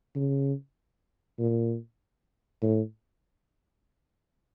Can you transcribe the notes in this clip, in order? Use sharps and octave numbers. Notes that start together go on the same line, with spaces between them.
C#3
A#2
A2